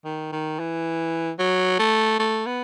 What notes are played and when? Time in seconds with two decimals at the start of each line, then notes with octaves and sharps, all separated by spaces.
0.05 D#3
0.32 D#3
0.59 E3
1.39 F#3
1.79 A3
2.19 A3
2.46 B3